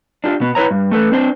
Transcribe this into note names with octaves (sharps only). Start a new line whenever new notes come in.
D4 F4 G4
B2 B3
E4 B4 C#5 A#5
G2
A3 A4 B4
C4 D4 C5